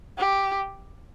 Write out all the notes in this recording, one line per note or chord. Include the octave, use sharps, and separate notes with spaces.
G4